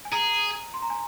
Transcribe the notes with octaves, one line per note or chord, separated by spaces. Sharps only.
G#5
G#4 A#5
C6
A#5
G#5